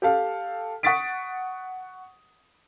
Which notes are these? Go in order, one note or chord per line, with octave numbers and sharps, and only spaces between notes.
G4 A4 F5
F#5 C#6 D#6 A6 B6 D7